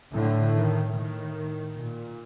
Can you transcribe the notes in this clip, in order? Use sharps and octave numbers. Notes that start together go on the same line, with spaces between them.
A2 D3
D#3
A2 D#3
A#2